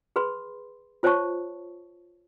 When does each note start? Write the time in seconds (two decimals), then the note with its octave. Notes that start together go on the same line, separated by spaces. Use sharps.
0.16 G#4 B4 B5 C6
1.03 F4 C5 C#5 E5 A5 C#6